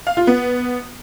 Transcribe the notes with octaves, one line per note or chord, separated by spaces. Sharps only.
F5
F4
B3